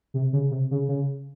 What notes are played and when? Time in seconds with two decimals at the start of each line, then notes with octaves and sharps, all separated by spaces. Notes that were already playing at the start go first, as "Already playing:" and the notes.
0.14 C3
0.33 C#3
0.51 C3
0.71 C#3
0.88 C#3